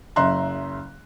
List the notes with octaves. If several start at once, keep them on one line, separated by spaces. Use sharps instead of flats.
F#1 C#3 E5 A#5 C6 F#6